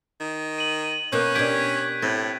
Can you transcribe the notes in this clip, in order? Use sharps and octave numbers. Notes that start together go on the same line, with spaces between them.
D#3
D#7 F#7
B2 A#3 C#4 F#6 G6
B2 D4 G4 G#6 B6 D7
A2 C4